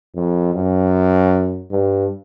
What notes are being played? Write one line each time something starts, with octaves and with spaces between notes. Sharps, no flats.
F2
F#2
G2